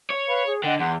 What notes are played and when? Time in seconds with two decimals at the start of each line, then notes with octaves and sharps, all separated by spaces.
0.10 C#5
0.28 B4 F5 B5
0.46 G#4
0.64 D3 D#5 F#5 G5
0.79 E2 F#5 C6